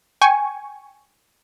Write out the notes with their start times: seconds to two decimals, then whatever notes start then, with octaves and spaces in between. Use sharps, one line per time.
0.21 G5 G#5 C#6